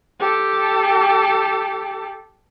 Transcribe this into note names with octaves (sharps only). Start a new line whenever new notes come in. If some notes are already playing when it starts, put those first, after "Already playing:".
G4 A4